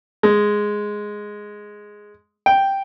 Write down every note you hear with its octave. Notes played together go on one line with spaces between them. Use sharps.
G#3
G5